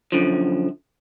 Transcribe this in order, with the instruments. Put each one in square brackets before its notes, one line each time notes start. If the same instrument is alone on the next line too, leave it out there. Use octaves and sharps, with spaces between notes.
[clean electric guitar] F#2 D3 F3